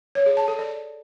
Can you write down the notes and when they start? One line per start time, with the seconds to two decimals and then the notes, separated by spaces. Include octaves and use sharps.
0.15 C#5
0.26 G#4
0.37 A5
0.48 A4
0.59 D5